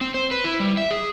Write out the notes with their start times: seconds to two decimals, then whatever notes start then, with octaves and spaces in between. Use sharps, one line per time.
0.01 C4
0.14 C5
0.31 B4
0.44 E4
0.60 G3
0.77 E5
0.91 G#4